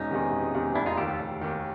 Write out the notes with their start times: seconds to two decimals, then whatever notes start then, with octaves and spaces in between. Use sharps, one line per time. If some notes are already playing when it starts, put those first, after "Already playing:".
Already playing: E1 C#4 D#4
0.11 E2 C3 D#3
0.32 E1
0.54 E2 C3 D#3
0.75 F1 D4 E4
0.86 D#4 F4
0.97 D#2 D#3 G4 A4
1.08 G4 A4
1.19 F1
1.41 D#2 D#3